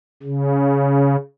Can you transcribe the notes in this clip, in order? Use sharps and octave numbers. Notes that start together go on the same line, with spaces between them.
C#3